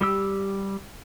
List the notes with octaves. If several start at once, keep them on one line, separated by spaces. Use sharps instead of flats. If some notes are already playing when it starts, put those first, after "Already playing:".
G3 G4 E6